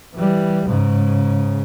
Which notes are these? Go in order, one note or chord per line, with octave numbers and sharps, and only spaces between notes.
E3 G3
G#2 C#3